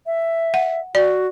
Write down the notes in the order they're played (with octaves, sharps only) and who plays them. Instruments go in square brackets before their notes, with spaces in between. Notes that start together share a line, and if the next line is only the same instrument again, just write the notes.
[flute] E5
[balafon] F#5
[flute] F#4 [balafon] D5